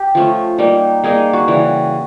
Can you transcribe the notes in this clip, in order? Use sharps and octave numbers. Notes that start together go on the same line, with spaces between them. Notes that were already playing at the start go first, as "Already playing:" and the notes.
Already playing: G4
F3 A3 C#4
G3 A#3 D#4
G3 A#3 D#4 G#4
F#4
C#3 E3 G3